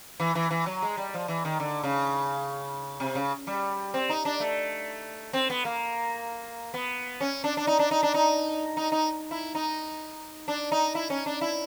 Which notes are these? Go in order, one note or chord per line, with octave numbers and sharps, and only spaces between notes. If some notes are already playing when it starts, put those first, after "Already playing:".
E3
E3
E3
F#3
G#3
G3
F3
E3
D#3
D3
C#3
C3
C#3
G3
C4
D#4
D4
A3
C4
B3
A#3
B3
C#4
D4
D4
D#4
D4
D#4
D4
D#4
D#4
D#4
E4
D#4
D4
D#4
E4
C#4
D4
E4